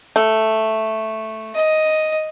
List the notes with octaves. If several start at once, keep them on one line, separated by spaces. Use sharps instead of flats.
A3
D#5